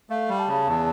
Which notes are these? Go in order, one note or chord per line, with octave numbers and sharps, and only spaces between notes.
A3 F5
G3
A5
C#3
E2